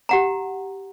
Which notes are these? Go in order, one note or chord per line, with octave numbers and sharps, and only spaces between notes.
G4 F#5 A#5